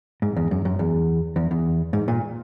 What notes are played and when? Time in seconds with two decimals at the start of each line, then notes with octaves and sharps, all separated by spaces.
0.22 G#2
0.37 E2
0.51 F#2
0.65 F#2
0.79 E2
1.36 E2
1.51 E2
1.93 G#2
2.08 A#2